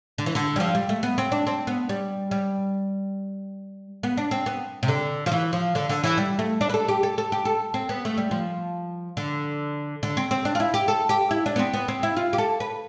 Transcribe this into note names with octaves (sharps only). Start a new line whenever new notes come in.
D3
E3
D3
G3
F3
G3
A3
B3
C4
D4
C4
B3
G3
G3
B3
D4
C4
B3
C3
D3
F3
E3
F3
D3
D3
E3
G3
A3
D4
B4
A4
G4
A4
A4
G4
A4
C4
B3
A3
G3
F3
D3
D3
C4
C4
D4
F4
E4
G4
A4
G4
E4
D4
B3
C4
B3
C4
E4
F4
G4
A4
B4